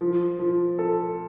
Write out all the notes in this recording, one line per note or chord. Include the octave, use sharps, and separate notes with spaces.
F3
F3
A4